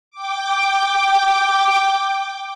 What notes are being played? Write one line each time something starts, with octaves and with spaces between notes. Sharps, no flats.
G5 D6